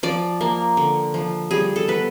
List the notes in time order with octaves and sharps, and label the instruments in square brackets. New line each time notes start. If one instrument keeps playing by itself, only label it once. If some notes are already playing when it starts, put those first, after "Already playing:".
[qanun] F3 D5
A#3
D3
F3
G3 G#4
A4
B3 B4